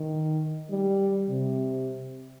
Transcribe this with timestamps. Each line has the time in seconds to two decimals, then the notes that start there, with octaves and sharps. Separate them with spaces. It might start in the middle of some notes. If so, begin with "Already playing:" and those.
Already playing: D#3
0.70 G3
1.29 C3